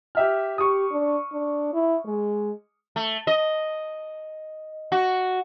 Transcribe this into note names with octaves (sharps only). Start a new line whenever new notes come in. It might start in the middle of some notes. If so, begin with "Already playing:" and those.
G4 E5 F6
G4 C#6 D#6
D4
D4
E4
G#3
A3
D#5
F#4